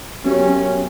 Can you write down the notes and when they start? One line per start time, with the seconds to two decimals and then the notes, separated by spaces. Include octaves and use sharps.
0.24 F#2 B3 C#4 G4 C#5
0.48 F#2